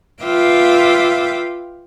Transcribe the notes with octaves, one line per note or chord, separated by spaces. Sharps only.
F4 B4 E5 F5 G5 D6